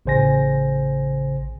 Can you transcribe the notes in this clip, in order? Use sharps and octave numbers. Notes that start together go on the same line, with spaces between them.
A1 C#3 C5 G#5 A#6